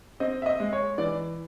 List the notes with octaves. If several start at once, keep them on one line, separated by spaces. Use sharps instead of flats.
C4 D#5
E5
D#5
G#3
C#5
E3 D5